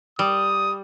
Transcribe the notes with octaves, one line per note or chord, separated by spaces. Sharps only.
G3 D#6